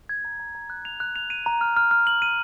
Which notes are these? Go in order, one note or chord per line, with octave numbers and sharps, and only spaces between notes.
G#6
A#5
A#5
A#5
F#6
F7
F#6
F7
D#7
A#5
F6
F6
F6
F#7
D#7